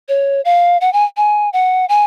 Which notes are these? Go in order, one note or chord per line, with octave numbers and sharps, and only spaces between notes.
C#5
F5
F#5
G#5
G#5
F#5
G#5